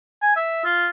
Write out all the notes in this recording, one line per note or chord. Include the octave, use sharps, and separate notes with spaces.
G#5
E5
F4